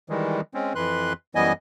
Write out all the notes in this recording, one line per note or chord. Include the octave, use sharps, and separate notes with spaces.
D#3 E3 G3 G#3
G#3 C4 C#4
F2 E3 B4 C6 F#6
F#2 E3 G3 B3 D#5 G#5